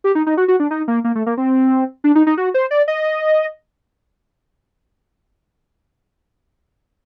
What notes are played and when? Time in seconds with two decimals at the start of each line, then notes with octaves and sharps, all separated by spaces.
0.04 G4
0.15 D#4
0.27 D#4
0.37 F#4
0.48 F#4
0.60 D4
0.71 D#4
0.88 A#3
1.04 A#3
1.15 A3
1.26 A#3
1.37 C4
2.04 D4
2.15 D#4
2.27 D#4
2.37 F#4
2.54 C5
2.71 D5
2.88 D#5